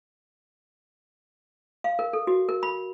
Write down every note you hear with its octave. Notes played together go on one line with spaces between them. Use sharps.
F5
A#4
A4
F#4
A#4
B5